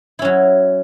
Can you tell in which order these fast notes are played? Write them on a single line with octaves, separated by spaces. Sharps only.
E4 C#4 F#3